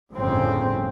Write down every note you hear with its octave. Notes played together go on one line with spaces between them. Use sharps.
G1 F2 A2 C#3 C4